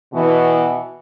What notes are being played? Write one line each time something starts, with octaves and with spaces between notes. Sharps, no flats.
B2 E3